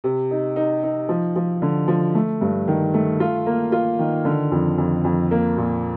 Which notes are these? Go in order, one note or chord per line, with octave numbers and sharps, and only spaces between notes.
C3
D#4
D#4
D#4
F3
F3
D3
F3
A3
G2
D#3
A3
F4
A#3
F4
D#3
D3
F2
F2
F2
A#3
A#2